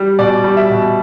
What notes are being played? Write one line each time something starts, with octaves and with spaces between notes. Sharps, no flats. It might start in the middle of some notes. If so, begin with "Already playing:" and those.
Already playing: G3
B2 D5
G3
E5
B2